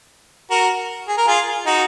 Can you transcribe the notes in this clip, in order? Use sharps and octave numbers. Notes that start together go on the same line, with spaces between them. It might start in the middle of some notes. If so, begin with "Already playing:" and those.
F#4 A#4
G#4
A#4
F4 G#4
D#4 F#4